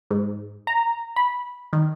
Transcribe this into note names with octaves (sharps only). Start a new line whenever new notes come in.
G#2
A#5
B5
D#3